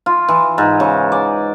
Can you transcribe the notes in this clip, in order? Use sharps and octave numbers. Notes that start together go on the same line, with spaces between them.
F4
E3
G#2
C#3
D5